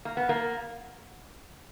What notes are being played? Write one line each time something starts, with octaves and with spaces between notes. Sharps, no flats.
A#3
B3
A#3